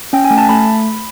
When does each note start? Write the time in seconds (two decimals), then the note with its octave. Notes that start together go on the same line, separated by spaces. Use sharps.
0.13 C#4 G5
0.25 G#5
0.30 A3
0.38 A5
0.49 A3 B5